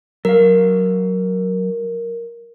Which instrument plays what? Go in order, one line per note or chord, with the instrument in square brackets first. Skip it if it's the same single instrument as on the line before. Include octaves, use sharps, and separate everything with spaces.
[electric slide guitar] F#3 F5 [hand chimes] A#4